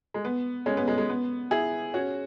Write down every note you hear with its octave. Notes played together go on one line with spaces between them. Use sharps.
G#3
B3
G#3 C#4
B3
G#3
G#3
B3
E4 G#4
C#4 F#4